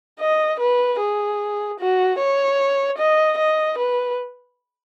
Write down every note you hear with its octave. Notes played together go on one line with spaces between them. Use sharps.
D#5
B4
G#4
F#4
C#5
D#5
D#5
B4